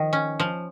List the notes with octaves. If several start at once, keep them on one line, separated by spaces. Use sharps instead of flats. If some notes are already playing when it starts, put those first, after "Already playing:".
Already playing: D#3 F3
C#4
F3